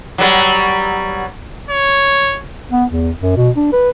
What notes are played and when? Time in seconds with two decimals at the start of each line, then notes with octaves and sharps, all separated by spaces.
0.18 F#3 G3 B4
1.69 C#5
2.72 B3
2.91 E2
3.22 F#2
3.37 B2
3.57 D4
3.72 B4